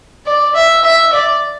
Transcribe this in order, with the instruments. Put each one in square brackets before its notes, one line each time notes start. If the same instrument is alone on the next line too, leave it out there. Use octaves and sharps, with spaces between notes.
[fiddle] D5
E5
E5
D5